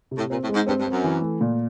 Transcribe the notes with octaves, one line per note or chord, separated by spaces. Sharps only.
C3
A2
A#2 C4
A2
G#3
G#2
G2 C4
G2
C4
F#2
E3
A3
A#2